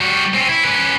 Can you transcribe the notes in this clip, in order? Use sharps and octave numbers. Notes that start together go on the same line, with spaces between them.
G3 F#4
C4 C#4
E4
C#4 B4